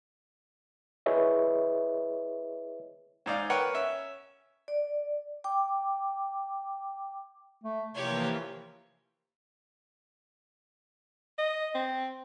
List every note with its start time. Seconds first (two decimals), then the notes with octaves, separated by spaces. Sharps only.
1.06 E4 G#4 B4 C#5 D#5 E5
3.26 G#2 D#4 D5 F5
3.50 A#4 B4 C#5 F#5 G5
3.74 C#4 E5
4.68 D5
5.44 G5 D6
7.64 A3
7.94 C3 E3 F3 A#3 G4 C#5
11.38 D#5
11.75 C4